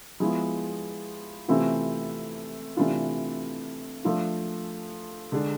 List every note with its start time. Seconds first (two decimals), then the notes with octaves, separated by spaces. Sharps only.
0.20 F3 G#3 B3 E4
1.48 C3 E3 A3 C4 F4
2.77 C3 E3 A3 D4 F4
4.04 F3 A3 D4 F4
5.32 D3 G#3 D4